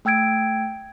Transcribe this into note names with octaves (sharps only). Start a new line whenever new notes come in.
A3 G5 E6 G#6 D7